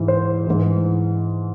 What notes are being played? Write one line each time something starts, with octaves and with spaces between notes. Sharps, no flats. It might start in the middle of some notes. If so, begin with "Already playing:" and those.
Already playing: G#2 E3
C5
G#2 E3